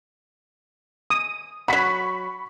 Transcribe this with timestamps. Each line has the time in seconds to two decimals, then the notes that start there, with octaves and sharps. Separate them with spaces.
1.10 D#6
1.68 F#3 F#4 B5 C#6 B6